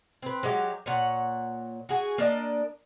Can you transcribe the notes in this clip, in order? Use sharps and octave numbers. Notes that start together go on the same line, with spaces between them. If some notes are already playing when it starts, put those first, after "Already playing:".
C4 B4
F#3 G#3 G4
A#2 C#5 F#5
F#4 G#4
A#3 D4 D#5